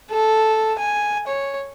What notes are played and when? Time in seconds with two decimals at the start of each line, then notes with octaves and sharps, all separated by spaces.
0.11 A4
0.79 G#5
1.27 C#5